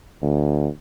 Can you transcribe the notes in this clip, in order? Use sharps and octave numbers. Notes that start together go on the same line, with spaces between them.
D2